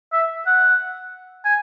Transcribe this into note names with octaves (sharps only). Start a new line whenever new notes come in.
E5
F#5
G#5